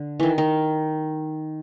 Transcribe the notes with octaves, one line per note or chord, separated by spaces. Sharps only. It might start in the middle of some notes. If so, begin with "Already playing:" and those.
Already playing: D3
D#3 E3
D#3